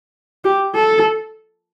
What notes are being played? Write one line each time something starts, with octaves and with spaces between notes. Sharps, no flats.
G4
A4